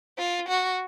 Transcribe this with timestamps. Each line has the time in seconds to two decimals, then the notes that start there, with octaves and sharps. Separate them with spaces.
0.18 F4
0.48 F#4